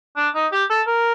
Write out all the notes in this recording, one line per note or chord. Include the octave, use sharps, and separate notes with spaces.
D4
D#4
G4
A4
A#4